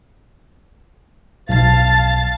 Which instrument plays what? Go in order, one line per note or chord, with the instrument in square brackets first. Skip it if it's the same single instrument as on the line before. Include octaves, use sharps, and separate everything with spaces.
[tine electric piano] B1 [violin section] F5 A5 A6